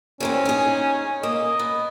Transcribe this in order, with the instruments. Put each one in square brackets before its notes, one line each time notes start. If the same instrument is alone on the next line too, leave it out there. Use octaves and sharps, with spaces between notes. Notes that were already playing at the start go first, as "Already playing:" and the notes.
[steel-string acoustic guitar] E2 A#3 C4 [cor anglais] C#4
[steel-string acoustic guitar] D#4 G#4
[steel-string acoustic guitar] A#3 [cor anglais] D#5
[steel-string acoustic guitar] B3